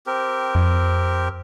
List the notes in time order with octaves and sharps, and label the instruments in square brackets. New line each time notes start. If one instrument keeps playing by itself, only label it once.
[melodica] C4 G4 A#4
[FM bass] F2